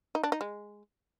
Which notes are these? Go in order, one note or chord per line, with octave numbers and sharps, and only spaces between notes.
D#4
D4
D#4
G#3